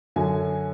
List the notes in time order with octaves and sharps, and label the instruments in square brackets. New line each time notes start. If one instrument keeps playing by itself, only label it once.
[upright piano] F#2 D3 F#3 G#5